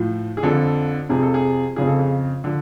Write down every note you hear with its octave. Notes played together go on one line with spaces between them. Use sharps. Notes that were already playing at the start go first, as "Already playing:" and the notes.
Already playing: A2 F3
G#4
F2 D3 F3 A4
F2 C3 F3 G#4
A4
G#4
F2 C#3 F3 G#4
A4
G#4
D3 F3